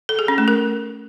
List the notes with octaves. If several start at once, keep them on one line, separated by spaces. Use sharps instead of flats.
A4
G#4
C#4
A3
A#4